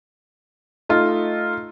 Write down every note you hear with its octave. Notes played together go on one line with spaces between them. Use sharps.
A3 D#4 F4